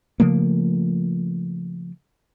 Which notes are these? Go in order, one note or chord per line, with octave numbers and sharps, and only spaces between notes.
C#3 F3 A3 A#3